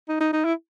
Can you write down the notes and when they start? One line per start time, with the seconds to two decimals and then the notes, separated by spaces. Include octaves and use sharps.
0.09 D#4
0.20 D#4
0.33 D#4
0.45 E4